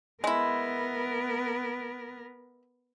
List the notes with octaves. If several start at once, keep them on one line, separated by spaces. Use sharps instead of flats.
G#3 B3 E4 A#4